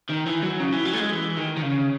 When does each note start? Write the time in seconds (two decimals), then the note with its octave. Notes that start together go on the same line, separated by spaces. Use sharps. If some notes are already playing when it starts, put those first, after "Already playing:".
0.09 D#3
0.26 E3
0.43 F#3
0.60 C#3
0.73 E3
0.86 F#3
0.94 A3
0.99 G#3
1.12 E3
1.37 D#3
1.57 D#3
1.62 C#3